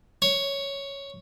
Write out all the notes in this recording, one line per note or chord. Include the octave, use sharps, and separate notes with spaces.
C#5